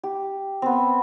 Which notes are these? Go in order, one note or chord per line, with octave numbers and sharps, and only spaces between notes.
G4
B3 C4